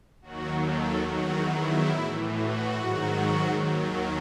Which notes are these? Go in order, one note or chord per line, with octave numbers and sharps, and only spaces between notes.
D#2 D#3 F#3 F#4
A4
E2 D#3 F#3 F#4
E4
A2 E3
F#4
G#2 D#3 F#3
D#2 D#3 F#3